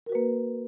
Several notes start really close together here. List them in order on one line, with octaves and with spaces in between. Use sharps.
A#4 F#4 B4 A#3